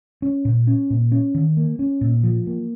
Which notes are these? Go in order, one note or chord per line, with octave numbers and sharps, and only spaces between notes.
C#4
A#2
C#4
A#2
C#4
D#3
A#3
C#4
A#2
F3
A#3